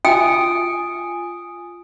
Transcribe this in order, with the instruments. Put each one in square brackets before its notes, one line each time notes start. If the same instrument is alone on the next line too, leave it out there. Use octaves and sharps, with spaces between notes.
[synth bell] F4 G#5 [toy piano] G5 [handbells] D#6 D7